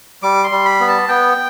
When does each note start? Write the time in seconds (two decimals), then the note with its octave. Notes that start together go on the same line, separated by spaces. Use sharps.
0.23 G3 D6
0.44 C6
0.51 G3
0.65 B5
0.80 B3
0.88 A5
1.09 B3 G5